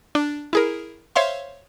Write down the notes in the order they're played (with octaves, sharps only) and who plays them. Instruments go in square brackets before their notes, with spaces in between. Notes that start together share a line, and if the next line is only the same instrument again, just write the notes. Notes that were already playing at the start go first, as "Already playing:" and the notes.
[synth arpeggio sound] D4
E4 G#4 A#4
C5 C#5 E5 F5 C6